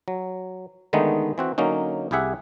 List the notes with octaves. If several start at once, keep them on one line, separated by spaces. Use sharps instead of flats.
F#3
D3 D#3 G#3 A3 B3 D#4
E3 C4 F#4
D3 F#3 A#3 C#4 D#4
C2 E4 G4 G#4 E5 F#5